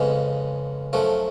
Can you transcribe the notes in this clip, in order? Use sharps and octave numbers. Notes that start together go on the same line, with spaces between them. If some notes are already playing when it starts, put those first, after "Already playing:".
Already playing: F2 C#3 G#3 B3
F#2 F3 A3